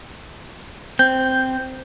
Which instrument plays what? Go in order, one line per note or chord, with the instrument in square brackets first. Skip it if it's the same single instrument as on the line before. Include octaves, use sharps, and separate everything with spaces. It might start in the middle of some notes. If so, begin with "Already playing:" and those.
[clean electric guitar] C4 [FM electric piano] G6